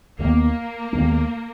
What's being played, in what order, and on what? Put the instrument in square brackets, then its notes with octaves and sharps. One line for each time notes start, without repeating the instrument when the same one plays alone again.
[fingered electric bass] D#2 D#3 G#3 B3 [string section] A#3
[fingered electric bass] D#2 D#3 G#3 B3